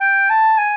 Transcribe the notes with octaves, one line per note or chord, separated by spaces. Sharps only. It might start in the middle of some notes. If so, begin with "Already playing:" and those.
G5
A5
G#5